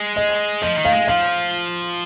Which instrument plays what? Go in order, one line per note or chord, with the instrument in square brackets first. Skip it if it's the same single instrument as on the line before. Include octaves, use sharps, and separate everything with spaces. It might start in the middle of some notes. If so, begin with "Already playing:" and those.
Already playing: [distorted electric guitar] G#3
[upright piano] D#5
[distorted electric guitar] F3 [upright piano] D#5
[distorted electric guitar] D#3
[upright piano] F5
[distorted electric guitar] G#3
[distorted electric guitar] F3 [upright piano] F5